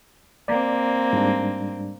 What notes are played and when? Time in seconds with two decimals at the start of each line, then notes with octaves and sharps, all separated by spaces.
0.48 A#3 C4 D5
1.13 G#2 G3 D4